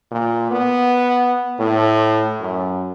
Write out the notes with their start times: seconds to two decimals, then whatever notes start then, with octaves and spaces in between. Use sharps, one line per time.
0.11 A#2
0.51 B3
1.59 A2
2.40 F#2